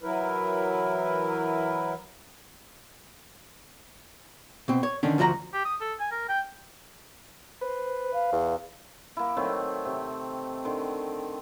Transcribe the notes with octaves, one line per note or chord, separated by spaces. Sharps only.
E3 F#3 E4 A#4 B4
B2 C4
C#5
D3 D#3 C#4 D4
D2 F3 F#4 D#5 A#5
G4
D#6
A4
G#5
A#4
G5
B4 C5
F5
E2
A#3 E4
D#3 F#3 A3 C4
C3
D3 D#3 C6